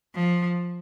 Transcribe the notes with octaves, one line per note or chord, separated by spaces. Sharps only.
F3